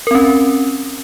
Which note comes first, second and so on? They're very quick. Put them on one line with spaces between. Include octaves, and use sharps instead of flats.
A#4 C4 C#4